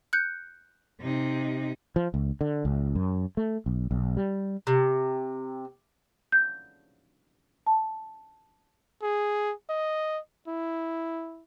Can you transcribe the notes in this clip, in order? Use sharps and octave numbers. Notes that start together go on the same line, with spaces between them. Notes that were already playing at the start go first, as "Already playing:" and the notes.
F#6 G6 C#7
C3 D#4
F3
C#2
D3
C#2
F#2
A3
B1
B1
G3
C3
G6
A5
G#4
D#5
E4